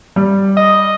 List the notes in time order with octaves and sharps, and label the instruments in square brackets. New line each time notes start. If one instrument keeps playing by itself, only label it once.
[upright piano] G3
[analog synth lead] D#5